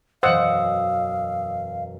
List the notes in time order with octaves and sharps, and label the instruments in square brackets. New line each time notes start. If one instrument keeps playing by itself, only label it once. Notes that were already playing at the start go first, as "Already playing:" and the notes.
[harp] E1 F#2 D#5 [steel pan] C5 F#5 [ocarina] F5 [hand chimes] D#6 E6